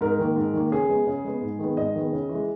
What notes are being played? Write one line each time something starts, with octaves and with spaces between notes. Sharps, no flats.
G#2 A#4
D#3 A#3
G#2
D#3 A#3
C#3 G#4
G#3 B3
C#3
G#3 B3
G#2
D#3 G#3 B3
G#2 D#5
D#3 G#3 B3
C#3
E3
G#3